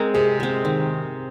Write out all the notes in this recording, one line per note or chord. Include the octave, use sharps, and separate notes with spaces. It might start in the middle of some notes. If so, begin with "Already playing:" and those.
Already playing: G#3 C4 A#4 C5
C3 G#4
G#3 C4
D#3